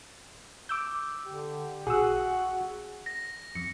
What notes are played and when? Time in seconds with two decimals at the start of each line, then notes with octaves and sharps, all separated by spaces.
0.69 D6 E6 G6
1.26 D3 G4
1.87 A#1 F#4 G#4 F#5 E6
3.06 A#6
3.55 F2 C#7